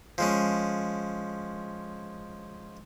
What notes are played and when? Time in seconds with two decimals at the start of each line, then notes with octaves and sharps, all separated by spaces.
0.18 F3 G#3 C#4